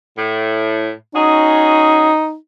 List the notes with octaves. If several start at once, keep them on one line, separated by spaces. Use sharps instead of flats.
A2
C#4 D#4 F#4 G#4